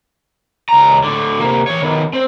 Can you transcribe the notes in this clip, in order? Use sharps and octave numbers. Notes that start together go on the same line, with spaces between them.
C#2 A#5
A2 D3
C3 A#3
E3 C#5
D#3 B3
C4